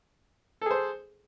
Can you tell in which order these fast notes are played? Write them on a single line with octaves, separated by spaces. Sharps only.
A4 G#4 C5